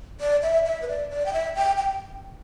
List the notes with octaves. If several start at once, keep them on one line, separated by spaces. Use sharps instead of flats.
D5
E5
E5
B4
D5
D5
G5
E5
G5
G5